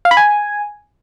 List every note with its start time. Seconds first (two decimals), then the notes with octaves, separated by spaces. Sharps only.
0.05 F5
0.11 B5
0.17 G#5